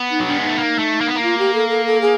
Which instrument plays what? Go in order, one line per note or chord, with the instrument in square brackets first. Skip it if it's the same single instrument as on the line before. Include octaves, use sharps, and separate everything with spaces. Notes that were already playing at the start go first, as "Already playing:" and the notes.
Already playing: [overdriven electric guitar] B3
[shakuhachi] D#4
[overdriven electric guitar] F#3
[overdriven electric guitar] G3 [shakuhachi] D4
[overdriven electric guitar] G#3 [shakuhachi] D#4
[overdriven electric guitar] A3
A#3
A3
A#3
B3
A#3
[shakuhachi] F4
G4
A4
A4
A4
G#4